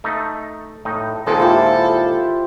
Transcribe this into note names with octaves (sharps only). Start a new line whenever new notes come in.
A3 D#4
A2 D#4
D#2 A#2 G#3 A4 C5
E4 F4 G4